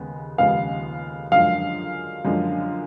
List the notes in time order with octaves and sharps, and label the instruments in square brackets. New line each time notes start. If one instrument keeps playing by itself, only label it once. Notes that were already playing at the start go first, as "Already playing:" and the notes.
Already playing: [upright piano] D#2 C#3 G#3 B3
[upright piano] D#2 C#3 F3 G#3 B3 [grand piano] F5
[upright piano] F#2 D3 F3 G#3 [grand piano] F5
[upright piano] F#2 D3 F3 G#3